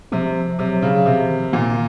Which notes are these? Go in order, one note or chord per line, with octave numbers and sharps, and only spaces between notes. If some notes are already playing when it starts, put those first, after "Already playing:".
C3 F3
C3 F#3
C#3
C3 F3
D#3
A#2 D#3